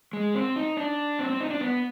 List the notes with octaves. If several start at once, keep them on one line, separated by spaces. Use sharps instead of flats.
G#3
C4
D#4
D4
C4
C4
D#4
D4
B3